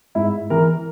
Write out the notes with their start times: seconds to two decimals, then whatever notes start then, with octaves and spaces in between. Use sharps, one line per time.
0.15 G#2 E4
0.50 E3 A#4